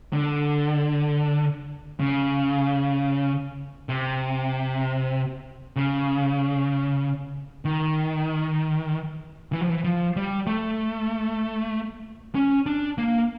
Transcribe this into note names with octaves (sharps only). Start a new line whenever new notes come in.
D3
C#3
C3
C#3
D#3
E3
F3
E3
F3
G3
A3
C#4
D4
A#3